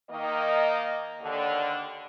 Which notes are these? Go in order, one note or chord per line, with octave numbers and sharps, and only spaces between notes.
D#3 A#3 D#5
D#2 D3